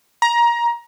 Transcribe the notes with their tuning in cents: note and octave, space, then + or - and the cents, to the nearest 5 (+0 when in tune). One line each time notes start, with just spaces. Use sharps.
A#5 +20